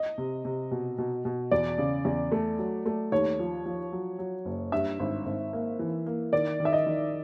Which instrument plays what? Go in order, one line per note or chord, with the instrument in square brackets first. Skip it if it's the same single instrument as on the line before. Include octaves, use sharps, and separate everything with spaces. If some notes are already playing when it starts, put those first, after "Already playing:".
Already playing: [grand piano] D#5
[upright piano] C3
C3
B2
B2
B2
[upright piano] E2 [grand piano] D5
[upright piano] C#3
E2
A3
F#3
A3
[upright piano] D#2 [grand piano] C#5
[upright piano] F3
F3
F#3
F#3
F#1
[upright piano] G2 [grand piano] E5
[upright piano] G#1
G#1
A#3
E3
A#3
[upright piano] D#3 [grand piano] D5
[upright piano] D#3
[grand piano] E5
D#5
[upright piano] D#3